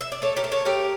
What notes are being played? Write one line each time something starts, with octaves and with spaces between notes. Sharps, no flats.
E5
D5
A3 A4 C#5
G4 A#4
A3
A4 C#5
A3 G4 A#4